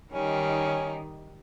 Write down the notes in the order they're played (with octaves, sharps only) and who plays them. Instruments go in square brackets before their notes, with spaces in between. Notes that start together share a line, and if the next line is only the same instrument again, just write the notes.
[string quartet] D#3 G3 D#4 [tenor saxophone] C#4